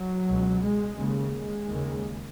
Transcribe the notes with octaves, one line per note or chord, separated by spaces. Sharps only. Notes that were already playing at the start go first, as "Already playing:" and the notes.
Already playing: F#3
C#2 B2
G#3
D#2 C#3
G#3
D#2 C#3